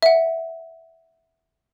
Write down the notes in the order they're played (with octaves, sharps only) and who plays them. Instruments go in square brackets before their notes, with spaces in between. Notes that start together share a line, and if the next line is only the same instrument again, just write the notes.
[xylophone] E5 F#5